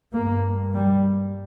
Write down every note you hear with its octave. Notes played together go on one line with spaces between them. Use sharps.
G2 A#3
G3